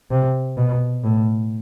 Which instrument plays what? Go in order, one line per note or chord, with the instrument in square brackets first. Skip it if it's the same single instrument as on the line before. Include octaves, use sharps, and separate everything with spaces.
[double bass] C3
B2
A2